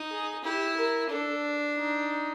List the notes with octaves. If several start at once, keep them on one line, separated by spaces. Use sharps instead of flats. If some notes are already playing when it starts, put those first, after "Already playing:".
Already playing: D#4
G#4
E4 G4
A#4
D4 A4
D#4